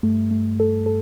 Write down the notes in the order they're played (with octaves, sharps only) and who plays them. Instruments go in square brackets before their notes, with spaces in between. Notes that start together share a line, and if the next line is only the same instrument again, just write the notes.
[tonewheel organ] G2 [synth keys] A3
[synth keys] A3
A4
A4